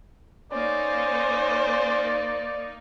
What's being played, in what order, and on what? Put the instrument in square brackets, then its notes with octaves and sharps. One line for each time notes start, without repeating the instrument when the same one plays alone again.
[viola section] A#3 D#4 [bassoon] C#4 [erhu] C5 [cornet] D5